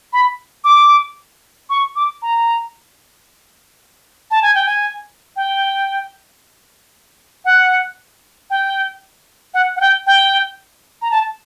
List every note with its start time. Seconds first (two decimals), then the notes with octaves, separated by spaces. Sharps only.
0.13 B5
0.64 D6
1.70 C#6
1.96 D6
2.22 A#5
4.31 A5
4.42 G#5
4.55 G5
4.66 G#5
5.36 G5
7.45 F#5
8.50 G5
9.54 F#5
9.76 F#5
9.81 G5
10.07 G5
11.02 A#5
11.11 A5